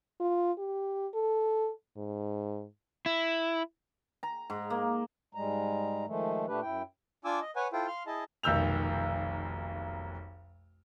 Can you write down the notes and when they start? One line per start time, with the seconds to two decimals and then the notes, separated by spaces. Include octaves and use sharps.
0.20 F4
0.58 G4
1.14 A4
1.97 G#2
3.06 E4
4.23 A#5
4.50 G#2
4.70 A#3
5.35 G#2 G3 G#3 A#5
6.06 D#3 F3 G#3 A3
6.47 A#2 A3 D4 G4 B4
6.61 F#2 E4 G5
7.25 D4 F4 G#5 D6 E6
7.41 D#5
7.56 B4 C#5 F#5 G#5
7.73 E4 F4 A4 C5 G5
7.87 F5 C6 F6
8.07 E4 G#4 D#5 A5
8.43 F1 B1 D#3 E6 G6 F7